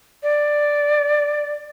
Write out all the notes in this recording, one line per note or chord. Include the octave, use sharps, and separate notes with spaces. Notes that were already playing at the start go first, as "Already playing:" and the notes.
D5